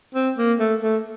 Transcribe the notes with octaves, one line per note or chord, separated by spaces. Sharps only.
C4
A#3
A3
A3